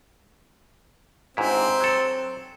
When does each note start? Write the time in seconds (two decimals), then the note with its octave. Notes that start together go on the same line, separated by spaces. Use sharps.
1.37 G1 G#2 C4 E4
1.80 F#3 A4